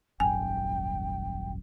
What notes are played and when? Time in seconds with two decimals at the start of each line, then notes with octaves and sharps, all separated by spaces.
0.20 D#1 G#1 F#2 G5 G#5